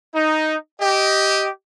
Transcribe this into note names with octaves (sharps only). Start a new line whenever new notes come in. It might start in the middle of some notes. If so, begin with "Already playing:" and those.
D#4
G4 D#5